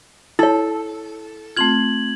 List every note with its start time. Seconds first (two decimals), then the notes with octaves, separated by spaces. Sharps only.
0.39 E4 A4 C#5
1.57 A3 C4 F4 G#6 F#7